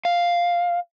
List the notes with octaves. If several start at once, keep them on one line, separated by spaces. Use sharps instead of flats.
F5